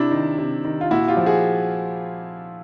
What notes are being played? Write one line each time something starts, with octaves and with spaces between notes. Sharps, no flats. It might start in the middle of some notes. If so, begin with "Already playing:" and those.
Already playing: C3 D4 E4
D#3
C3
D#3
F4
A#2 E4 F#4
F4 G4
F3
F#4 G#4